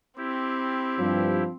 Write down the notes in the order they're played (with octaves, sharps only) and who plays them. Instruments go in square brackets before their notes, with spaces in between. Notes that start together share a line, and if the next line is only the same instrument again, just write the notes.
[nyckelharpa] C4 [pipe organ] E4 G4
[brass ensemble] G2 [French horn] F3